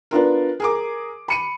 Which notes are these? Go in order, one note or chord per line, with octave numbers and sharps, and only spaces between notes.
B3 D4 F4 A#4
G#4 A#4 D6
B5 C#7 D#7